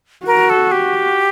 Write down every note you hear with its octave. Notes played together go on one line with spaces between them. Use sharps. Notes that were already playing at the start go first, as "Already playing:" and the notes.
F#4 A#4
A4
G4